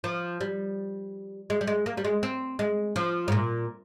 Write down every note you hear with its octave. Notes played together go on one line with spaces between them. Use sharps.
F3
G3
G#3
G3
G#3
A#3
G3
G#3
C4
G#3
F3
G#2
A#2